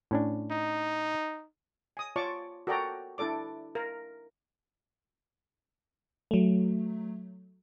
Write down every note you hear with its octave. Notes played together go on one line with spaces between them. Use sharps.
A2 C#4 D4
D#4
G#5 D#6
F4 C#5 D5 A5 C#6 D6
F#4 A4 A#4 D5 G5 A#5
D4 E4 A4 D5 D6
A#4 F5
F#3 A3